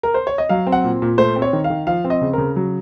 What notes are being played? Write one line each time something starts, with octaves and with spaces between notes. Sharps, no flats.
A#4
C5
C#5
D#5
F#3 F5
C4
F#5
A#2
A#2
A3 C5
C4
C#5
D#3
F5
D#3
F3 F5
C4
D#5
C#3
C#3 A#4
F#3